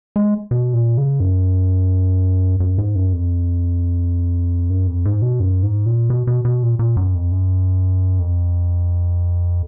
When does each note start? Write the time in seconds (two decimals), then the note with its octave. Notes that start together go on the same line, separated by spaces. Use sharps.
0.16 G#3
0.51 B2
0.73 A#2
0.98 C#3
1.20 F#2
2.60 F#2
2.78 G#2
2.95 F#2
3.13 F2
4.70 F#2
4.87 F2
5.05 G#2
5.22 B2
5.40 F#2
5.63 G#2
5.86 A#2
6.10 B2
6.27 B2
6.45 B2
6.63 A#2
6.79 A#2
6.97 F#2
7.15 F2
7.32 F#2
8.19 F2